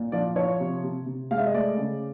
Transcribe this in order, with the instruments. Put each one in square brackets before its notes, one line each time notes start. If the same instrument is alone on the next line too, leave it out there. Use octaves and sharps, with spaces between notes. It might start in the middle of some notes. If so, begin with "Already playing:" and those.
Already playing: [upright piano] A#2
F3 D5
F3 C#5
C3
C3
C3
G#3 F5
E5
D#5
A3 D5
C#3